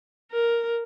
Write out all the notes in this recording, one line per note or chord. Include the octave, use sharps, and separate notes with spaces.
A#4